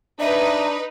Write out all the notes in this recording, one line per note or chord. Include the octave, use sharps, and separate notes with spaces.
D4 D#4 B4 E5